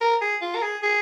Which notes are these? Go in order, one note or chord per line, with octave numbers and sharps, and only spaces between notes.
A#4
G#4
F4
A#4
G#4
G#4